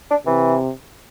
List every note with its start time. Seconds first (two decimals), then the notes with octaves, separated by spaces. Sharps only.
0.10 D4
0.26 C3 E3